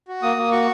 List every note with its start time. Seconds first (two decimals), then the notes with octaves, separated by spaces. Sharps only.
0.08 F#4
0.23 A#3 D#6
0.37 A#3
0.52 F#4 C#6